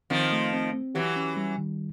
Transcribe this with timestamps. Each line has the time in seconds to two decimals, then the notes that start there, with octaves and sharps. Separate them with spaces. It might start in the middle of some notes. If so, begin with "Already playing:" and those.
0.10 D#3 F3 C4
0.32 A3
0.53 C4
0.73 C4
0.95 E3 F#3 G4
1.16 C#4
1.37 G3
1.58 D#3